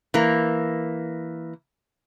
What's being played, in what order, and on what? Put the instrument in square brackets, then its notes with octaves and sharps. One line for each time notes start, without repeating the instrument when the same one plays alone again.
[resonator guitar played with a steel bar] E3 A#3